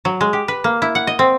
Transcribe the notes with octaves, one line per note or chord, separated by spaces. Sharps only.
F#3
G#3
G4
B4
A#3
E4
F#5
D#5
C4